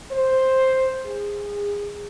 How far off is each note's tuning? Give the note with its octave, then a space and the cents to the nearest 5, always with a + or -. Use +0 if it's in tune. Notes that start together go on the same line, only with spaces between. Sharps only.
C5 +5
G#4 -25